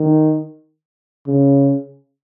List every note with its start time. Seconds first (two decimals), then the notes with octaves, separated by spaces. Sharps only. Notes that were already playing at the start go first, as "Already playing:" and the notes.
Already playing: D#3
1.27 C#3